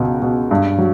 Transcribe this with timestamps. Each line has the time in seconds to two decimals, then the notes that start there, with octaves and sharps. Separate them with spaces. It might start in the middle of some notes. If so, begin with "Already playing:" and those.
Already playing: C#2 B2
0.22 B2
0.51 G2
0.78 F#3